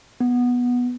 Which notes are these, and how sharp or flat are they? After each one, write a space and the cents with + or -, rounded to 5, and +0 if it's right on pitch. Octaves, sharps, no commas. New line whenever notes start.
B3 -10